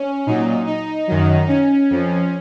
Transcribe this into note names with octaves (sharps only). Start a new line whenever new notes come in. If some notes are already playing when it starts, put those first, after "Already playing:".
Already playing: C#4
A#2 F#3 D#4
D#4
F#2 D#3 F#3
C#4
F2 F3